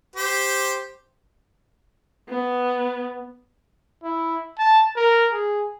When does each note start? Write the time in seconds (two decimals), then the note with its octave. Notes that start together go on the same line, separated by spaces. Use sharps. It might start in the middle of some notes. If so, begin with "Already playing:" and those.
0.16 G4 C5
2.29 B3
4.04 E4
4.59 A5
4.97 A#4
5.33 G#4